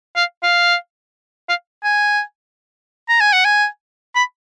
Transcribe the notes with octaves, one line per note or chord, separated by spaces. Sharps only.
F5
F5
F5
G#5
A#5
G#5
F#5
G#5
B5